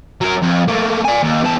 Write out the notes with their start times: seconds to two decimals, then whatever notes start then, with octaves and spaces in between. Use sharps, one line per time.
0.21 F#3 A#4
0.42 F2
0.68 A3 A#3
1.05 D5 G#5
1.23 D#2
1.44 E2 A5